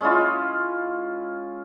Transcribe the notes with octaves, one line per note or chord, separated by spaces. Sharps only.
G#3 C#4 E4 F4